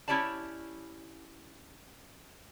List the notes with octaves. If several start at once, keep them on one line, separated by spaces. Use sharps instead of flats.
C#4 E4 G4 C#5 D5 A5